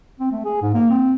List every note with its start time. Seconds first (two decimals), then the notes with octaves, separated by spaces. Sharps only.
0.20 C4
0.32 A3
0.45 G#4
0.62 G#2
0.74 A#3
0.90 C4